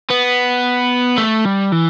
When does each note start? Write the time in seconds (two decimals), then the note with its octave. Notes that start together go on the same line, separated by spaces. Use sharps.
0.10 B3
1.18 A3
1.45 G3
1.72 E3